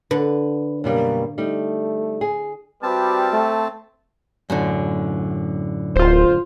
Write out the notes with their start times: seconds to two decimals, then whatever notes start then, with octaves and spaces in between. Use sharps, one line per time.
0.11 D3 B4
0.84 F#2 B2 G3 A#3
1.38 G3 A3 D#4
2.21 G#4
2.83 G3 C4 F#4 B4 E5 A5
3.33 A3 C5
4.50 F#2 A2 D3
5.96 D1 F4 C5